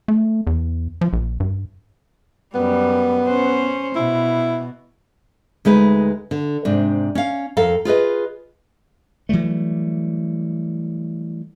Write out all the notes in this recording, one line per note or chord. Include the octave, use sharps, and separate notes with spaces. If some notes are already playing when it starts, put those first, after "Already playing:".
A3
E2
F3
A#1
G2
F#2 G3 B3
C#4 C5
B2 E4
D2 G#3 D#4 B4
D3
G#2 C3 D4
C#4 F5
F2 A4 A#4 F5
F4 G#4 B4 D#5
E3 F#3 G3 A3